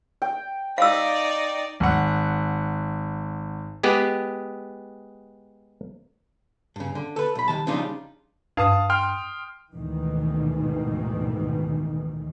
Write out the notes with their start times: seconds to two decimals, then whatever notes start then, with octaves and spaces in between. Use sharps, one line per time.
0.22 G5
0.78 D#4 D5 F5 E6
1.80 G#1 F#5
3.83 G#3 B3 G4 G#4
6.76 G2 C#3
6.95 D3
7.16 A4 B4
7.35 B1 B5
7.48 C2 D#3 A5
7.67 C#3 F3 G3 D4 D#4 F4
8.57 G2 F5 A5 D#6
8.90 G5 C6 F6
9.73 D2 G#2 B2 D#3 E3